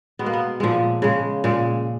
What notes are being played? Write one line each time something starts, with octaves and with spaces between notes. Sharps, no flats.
B2 G#3 B3
A#3
B3
A#2 F3 G#3
C#3 G#3
A#2 G#3